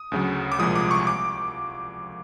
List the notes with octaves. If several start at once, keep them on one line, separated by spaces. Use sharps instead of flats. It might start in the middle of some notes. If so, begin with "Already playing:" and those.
Already playing: D#6
D2 C#3 F#3
D6
C2 A#2 F3 G#3 D#6
D6
C#6
D6